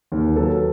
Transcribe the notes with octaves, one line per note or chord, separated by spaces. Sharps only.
D#2
F#3 A4 B4